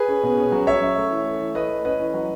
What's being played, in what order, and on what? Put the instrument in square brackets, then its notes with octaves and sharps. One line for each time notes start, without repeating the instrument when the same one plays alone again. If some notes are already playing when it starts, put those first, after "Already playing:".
Already playing: [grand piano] G#4 B4
C#4
B2
C#4
F#3
F#3 C#5 E5
C#4
A3
E3
A3
E3
A3 B4 D#5
E3
C#4 B4 D#5
E3
F#3